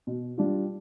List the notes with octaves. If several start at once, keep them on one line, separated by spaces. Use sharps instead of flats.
B2
G3 D4 F4